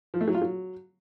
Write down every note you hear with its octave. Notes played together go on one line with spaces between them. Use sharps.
F3
A3
F#3
F4
F#3